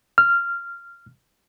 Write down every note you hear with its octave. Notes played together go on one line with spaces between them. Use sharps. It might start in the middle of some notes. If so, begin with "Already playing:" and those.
F6